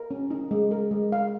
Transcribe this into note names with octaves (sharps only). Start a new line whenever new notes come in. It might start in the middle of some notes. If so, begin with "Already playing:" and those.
Already playing: A#4
C#4
D#4
G#3
A#4
G#3
F5